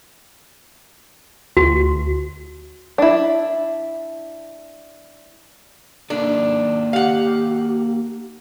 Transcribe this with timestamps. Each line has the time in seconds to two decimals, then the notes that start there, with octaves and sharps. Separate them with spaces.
1.57 D2 F#4
2.98 D4 E4
6.10 A#3 D4 D#4 A4
6.93 G4 F5 F#5